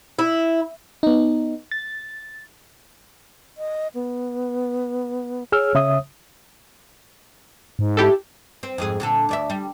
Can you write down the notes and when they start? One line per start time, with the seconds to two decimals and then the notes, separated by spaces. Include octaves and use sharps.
0.19 E4
1.03 B3 D#4
1.71 A6
3.58 D#5
3.94 B3
5.52 G#4 C#5 E6 F6
5.75 C#3 E5 D#6
7.79 G#2
7.97 E4 G4 A4
8.63 C4
8.78 F2 G#2 G#4
9.00 A#2 D3 A4
9.29 D2 D5 E5
9.50 G3